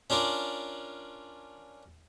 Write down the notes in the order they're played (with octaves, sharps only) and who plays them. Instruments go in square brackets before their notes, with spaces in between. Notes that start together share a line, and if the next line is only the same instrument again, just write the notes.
[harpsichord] C#4 D4 F4 A#4 D5